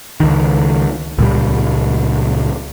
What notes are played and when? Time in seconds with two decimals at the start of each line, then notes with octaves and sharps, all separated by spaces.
0.20 C#2 D#3
1.18 C#2 A#2 G3